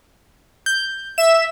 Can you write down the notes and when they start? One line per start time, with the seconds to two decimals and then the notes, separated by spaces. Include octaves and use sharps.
0.66 G6
1.18 E5 E7